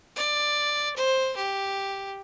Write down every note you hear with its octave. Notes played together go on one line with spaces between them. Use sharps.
D5
C5
G4